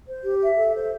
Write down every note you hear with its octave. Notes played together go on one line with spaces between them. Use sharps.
C5
G4
E5
A4
C5